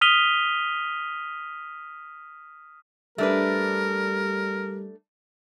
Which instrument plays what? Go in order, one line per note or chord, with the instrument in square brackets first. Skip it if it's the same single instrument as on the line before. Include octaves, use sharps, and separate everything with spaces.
[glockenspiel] D#6 F6 B6 D#7 F7 G7
[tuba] G3 [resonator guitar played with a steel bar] A3 D4 B4 [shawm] A#4